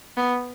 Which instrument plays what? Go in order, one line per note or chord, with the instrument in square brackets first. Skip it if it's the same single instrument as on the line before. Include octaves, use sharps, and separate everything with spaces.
[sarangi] B3